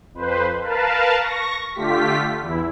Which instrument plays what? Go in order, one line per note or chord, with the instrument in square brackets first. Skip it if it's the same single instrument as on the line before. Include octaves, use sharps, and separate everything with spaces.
[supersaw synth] F2 B4 C5
A#4 B4 F5 A5
C#6 A#6
D3 A3 F4 G4 B6
E2 E4